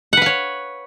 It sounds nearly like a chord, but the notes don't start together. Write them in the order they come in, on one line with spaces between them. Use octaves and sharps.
F#5 B4 F5 C#5